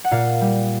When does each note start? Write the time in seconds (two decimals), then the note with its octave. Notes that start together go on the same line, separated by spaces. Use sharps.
0.04 F#5
0.11 A#2 F5
0.41 G3